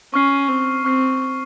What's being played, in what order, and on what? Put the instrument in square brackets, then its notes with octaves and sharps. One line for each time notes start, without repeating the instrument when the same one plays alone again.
[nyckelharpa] C#4 [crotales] C#6 F6 C7
[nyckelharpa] C4
[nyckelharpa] C4 [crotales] C#6 F6 C7